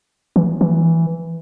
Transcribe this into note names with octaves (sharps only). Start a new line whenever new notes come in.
E3
E3